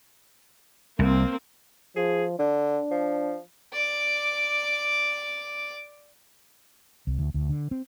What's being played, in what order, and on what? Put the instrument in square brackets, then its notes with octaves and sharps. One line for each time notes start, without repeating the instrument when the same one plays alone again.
[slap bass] C2 [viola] A#3 C4
[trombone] F3 [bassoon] G#4
[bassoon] D3 [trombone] D4
[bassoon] F3
[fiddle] D5 D6
[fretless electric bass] C2
D2
D2
D3
C4